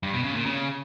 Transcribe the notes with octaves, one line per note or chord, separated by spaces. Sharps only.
G2
B2
C#3
A#2
C#3